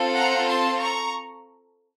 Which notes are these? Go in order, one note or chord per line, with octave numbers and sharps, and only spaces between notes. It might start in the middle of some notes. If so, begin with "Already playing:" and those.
Already playing: C4 F4 A4
F#5 A#5
A5 C6
A#5 C#6